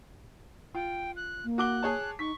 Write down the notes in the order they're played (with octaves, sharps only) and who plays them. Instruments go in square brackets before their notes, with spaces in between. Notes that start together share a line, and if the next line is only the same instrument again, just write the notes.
[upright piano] F4 [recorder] G5
[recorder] F#6
[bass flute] A#3
[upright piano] F#4 D6 G7 [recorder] F#6
[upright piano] G#4 C#5 A5
[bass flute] D#4 [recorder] C#6 [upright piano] B6